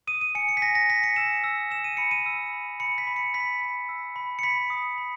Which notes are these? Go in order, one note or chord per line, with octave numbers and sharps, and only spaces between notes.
D#6 D#7
D#7
G#5 C#7
C#7
B6
G#5 A#6
A#6
G#5 B6
C#7
E6 E7
E6
E6 E7
D#7
B5 C#7
D#7
E6
B5
B5 C#7
B6
B5
C#7
B5 B6
B5
E6
B5
C#7
B5 B6
D#6
B5